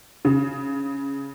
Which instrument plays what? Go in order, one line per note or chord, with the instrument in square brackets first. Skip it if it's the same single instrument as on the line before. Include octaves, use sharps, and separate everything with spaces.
[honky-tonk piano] C#3